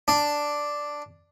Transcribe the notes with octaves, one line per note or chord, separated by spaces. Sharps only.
D4